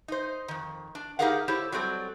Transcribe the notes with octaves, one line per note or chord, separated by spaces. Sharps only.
D#4 C5
F2 D#3
D4
D#4 G4 G#4 A#4 F5 F#5
E4 G4 A4 C5 C#5
F#3 G3 C4 A4